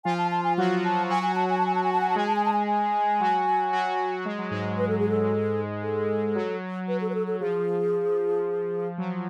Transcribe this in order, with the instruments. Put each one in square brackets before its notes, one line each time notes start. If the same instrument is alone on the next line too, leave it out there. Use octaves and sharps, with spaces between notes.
[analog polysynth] F3 F4 [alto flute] G#5
[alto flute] A5
A5
G#5
[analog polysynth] F#3 F#4 [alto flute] F#5
[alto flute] A5
[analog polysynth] F#3 F#4 [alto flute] G#5
[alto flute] G#5
A5
G#5
A5
G#5
A5
G#5
A5
G#5
A5
[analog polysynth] G#3 G#4 [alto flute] G#5
[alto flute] A5
G#5
A5
G#5
G#5
[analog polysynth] F#3 F#4
F#3 F#4
G#3
F#3
G#2 G#3
[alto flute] B4
A4
G#4
A4
A4
[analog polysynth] F#3
[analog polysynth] F#3 [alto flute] B4
[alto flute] A4
B4
A4
A4
[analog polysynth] F3 [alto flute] G#4
[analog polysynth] F#3